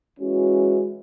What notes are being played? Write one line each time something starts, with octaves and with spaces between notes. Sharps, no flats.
E3 G#3 C#4 F#4